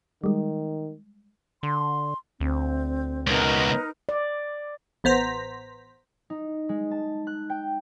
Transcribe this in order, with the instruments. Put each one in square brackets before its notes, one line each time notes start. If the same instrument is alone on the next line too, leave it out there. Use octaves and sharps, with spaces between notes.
[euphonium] D#3 [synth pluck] G3 G#3
[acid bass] D3 [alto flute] C6
[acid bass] D2 [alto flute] C4
[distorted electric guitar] C#2 B2 [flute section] D#4 A#4 B4
[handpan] D5
[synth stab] A1 B3 C5 A#5 B6
[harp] D#4
G#3
A5
F#6
G5